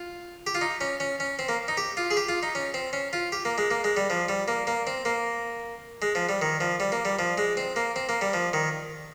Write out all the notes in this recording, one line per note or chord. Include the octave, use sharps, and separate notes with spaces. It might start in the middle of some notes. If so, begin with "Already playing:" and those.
Already playing: F4
G4
F4
D#4
C#4
C#4
C#4
C4
A#3
D#4
G4
F4
G#4
G4
F4
D#4
C#4
C4
C#4
F4
G4
A#3
G#3
A#3
G#3
G3
F3
G3
A#3
A#3
C4
A#3
G#3
F3
G3
D#3
F3
G3
A#3
G3
F3
G#3
C4
A#3
C4
A#3
G3
F3
D#3